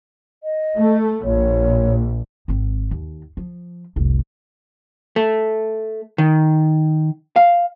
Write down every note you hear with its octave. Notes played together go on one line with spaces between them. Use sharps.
D#5
A3
A#1 C#5
G#1 C4
D#2
F3
F1 C2
A3
D#3
F5